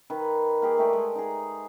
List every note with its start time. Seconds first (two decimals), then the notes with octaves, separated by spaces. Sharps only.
0.10 D#3 B4
0.62 A#3 G4 G#4
0.78 A3 G4 D5
0.93 G#3 G#5
1.15 D#4 G#4